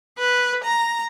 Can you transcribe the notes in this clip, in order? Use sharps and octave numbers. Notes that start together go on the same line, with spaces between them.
B4
A#5